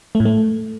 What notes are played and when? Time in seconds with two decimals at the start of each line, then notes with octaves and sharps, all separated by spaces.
0.15 A3
0.20 A2
0.25 A3